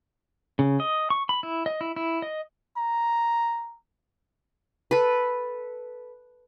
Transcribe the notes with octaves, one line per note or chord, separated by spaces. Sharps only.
C#3
D#5
C#6
B5
E4
D#5
E4
E4
D#5
A#5
A4 B4